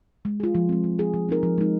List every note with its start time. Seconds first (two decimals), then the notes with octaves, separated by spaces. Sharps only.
0.25 G#3
0.40 F4 G#4
0.55 F3
0.69 G#3 C4
0.84 F3
0.99 G#3 C4 G#4
1.14 F3
1.29 C4 D#4 A#4
1.43 F3
1.58 G#3 D#4